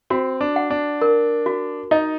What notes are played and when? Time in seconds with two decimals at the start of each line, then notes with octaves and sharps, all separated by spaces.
0.10 C4 F#4
0.41 D4
0.56 F#5
0.70 D4
1.01 A#4
1.46 F#4
1.91 D#4 D#5